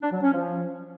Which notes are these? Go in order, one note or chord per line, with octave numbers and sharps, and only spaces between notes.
D4
F#3
C#4
F3